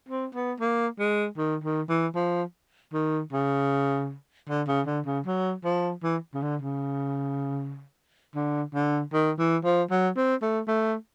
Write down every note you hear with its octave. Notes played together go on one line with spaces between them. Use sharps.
C4
B3
A#3
G#3
D#3
D#3
E3
F3
D#3
C#3
D3
C#3
D3
C#3
F#3
F3
E3
C#3
D3
C#3
D3
D3
D#3
E3
F3
F#3
C4
A3
A3